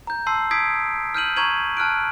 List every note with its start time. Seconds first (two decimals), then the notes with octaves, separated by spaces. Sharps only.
0.07 A#5 G6
0.27 A5 C6 E6 C7
0.51 D#6 E6 G#6 B6 C7 D7
1.14 F6 G6 D#7 F#7
1.36 A#5 C#6 G#6 D#7 F#7
1.77 A5 F6 F#6 D7